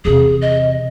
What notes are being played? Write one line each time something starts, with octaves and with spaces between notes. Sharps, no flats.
E2 C3 G#4
D#5